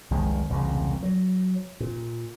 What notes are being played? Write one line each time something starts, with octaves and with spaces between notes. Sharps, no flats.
F1 C2 D#3 G#3
E1 C2 A#2 C#3
F#3
A#2